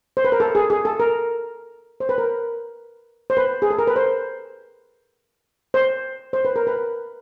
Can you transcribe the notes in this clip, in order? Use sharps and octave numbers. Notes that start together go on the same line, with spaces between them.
C5
B4
A#4
A4
G#4
G#4
A4
A#4
C5
B4
A#4
C5
B4
G#4
A4
A#4
B4
C5
C5
C5
B4
A#4
B4